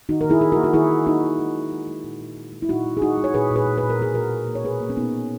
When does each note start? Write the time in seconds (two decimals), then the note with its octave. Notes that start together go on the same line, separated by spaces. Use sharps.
0.09 D#3 D#4 F#4
0.21 D#3 A#4
0.30 E4 G#4
0.41 D#3 G#4
0.52 F#4 A#4
0.57 A#3
0.64 F#4
0.74 D#3 E4 G#4
0.90 A#3
1.06 A#3 D#4 F#4
1.23 D#3
1.39 G#3
1.56 G#3
1.72 G#3
1.88 G#3
2.04 A#2
2.20 A#2
2.37 A#2
2.52 G#3
2.62 E4
2.69 A#2 D#4 F#4
2.86 G#3
2.97 G#4
3.02 G#3 D#4 F#4
3.18 G#3
3.24 C#5
3.34 A#2 G#4 B4
3.51 A#2
3.56 G#4 B4
3.67 A#2
3.78 B4
3.83 A#2
3.90 A#4
3.99 B2 G#4
4.14 A#3 F#4 A#4
4.33 B2
4.48 A#3
4.55 C#5
4.65 B2 G#4 B4
4.80 A#3
4.90 C#4
4.97 B2 B3 D#4
5.13 A#3